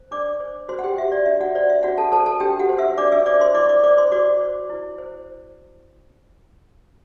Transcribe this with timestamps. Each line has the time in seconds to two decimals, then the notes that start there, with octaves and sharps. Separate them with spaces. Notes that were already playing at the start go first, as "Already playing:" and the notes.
Already playing: C5
0.11 D4 D5 D6
0.40 C5
0.68 F#4 C5 C6
0.79 F#5
0.84 G4 G5
0.97 F#4 E5
1.12 D5
1.26 D4 E5
1.40 F#4 F#5
1.55 C5 D5
1.70 E5
1.83 D4 F#4 F#5
1.98 A4 A5
2.11 A4 C5 A5
2.26 A4 A5
2.40 D4 G4 G5
2.59 F#4 F#5
2.69 C5
2.78 E5 E6
2.97 D4 D5 D6
3.12 E5 E6
3.26 C5 D5 D6
3.40 C5 C6
3.54 E4 D5 D6
3.69 D5 D6
3.84 C5 D5 D6
3.97 C5 C6
4.12 F#4 D5 D6
4.41 C5
4.70 E4
4.98 C5